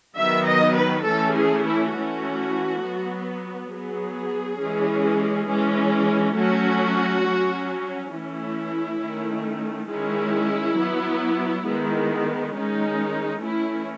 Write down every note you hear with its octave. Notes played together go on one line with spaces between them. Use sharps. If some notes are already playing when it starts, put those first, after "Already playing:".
D#3 F#3 B3 E5
D#5
B4
E3 A3 C#4 A4
G#4
E4
E3 A3 C#4 F#4
F#3 B3
F#3 G#4
B3
E3 G#3 C#4
E3 G#3 C#4
F#3 A3 C#4 F#4
F#3 C#4
E3 A3 C#4 E4
D#3 A3 C#4
D#3 G#3 C#4 E4
F#3 B3
D#3 G#3 B3
D#3 G#3 C#4 D#4
E3 A3 C#4 E4